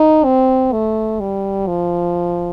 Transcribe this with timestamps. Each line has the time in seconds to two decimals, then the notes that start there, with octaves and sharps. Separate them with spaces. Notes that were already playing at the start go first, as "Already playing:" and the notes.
Already playing: D#4
0.24 C4
0.72 A3
1.20 G3
1.67 F3